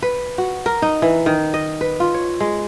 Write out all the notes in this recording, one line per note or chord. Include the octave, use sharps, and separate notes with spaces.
B4
F#4
A#4
D#4
E3
D#3
D#5
B4
F4
C#5
G#3